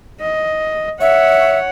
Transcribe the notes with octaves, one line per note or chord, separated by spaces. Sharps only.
D#5
C#5 E5 F#5